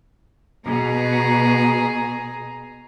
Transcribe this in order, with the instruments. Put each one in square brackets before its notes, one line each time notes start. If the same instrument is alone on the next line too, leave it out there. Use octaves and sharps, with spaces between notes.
[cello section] B2 [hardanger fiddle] G#4 A#5